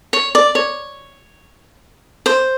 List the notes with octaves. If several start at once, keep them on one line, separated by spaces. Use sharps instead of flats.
C#5
D5
C#5
C5